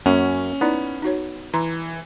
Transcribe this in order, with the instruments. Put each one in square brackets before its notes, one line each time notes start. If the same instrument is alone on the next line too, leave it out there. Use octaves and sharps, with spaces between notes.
[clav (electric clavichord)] F#2 [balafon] A#3 [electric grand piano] C#4
[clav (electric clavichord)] B3 [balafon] D#4 E4 D5
[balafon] D#4 F#4 C#5
[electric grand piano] E3 [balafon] A#5 C6